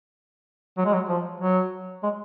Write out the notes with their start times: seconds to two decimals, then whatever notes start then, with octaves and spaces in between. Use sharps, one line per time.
0.78 F#3
0.86 G#3
0.94 F#3
1.09 F3
1.41 F#3
2.03 G#3